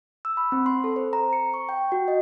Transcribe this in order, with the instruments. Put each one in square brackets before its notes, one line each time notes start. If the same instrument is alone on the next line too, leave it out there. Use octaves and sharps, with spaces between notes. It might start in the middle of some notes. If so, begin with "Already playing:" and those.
[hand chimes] E6
B5
C4
C6
A4
C5
A#5
C#7
C#6
G5
F#4
D#5